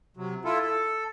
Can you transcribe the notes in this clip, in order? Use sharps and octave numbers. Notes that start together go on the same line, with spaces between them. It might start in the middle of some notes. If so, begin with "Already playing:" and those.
C3 F#3
E4 F4 A4
A4